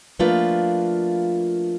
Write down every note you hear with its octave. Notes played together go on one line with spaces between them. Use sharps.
F3 A3 A#3 D4 F4 B4